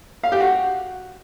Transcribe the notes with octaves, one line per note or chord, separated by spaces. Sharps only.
F5
G4
F#4